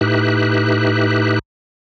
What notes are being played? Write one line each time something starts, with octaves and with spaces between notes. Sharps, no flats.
A2 D#4 G4 B4 E5 F#6